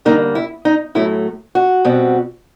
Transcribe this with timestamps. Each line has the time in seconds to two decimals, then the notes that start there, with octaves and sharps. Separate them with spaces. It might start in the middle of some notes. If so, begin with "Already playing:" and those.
0.05 D3 G3 A#3 D#4
0.35 E4
0.65 D#4
0.95 A2 F#3 A3 E4
1.55 F#4
1.85 B2 G3 C4